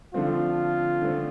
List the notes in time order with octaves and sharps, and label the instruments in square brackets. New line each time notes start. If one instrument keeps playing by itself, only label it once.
[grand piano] D3 F3 A3 C4 [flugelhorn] F4
[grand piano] D3 F3 A3 C4